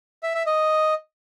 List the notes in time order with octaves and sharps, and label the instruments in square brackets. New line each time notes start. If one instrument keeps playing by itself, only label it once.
[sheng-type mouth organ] E5
E5
D#5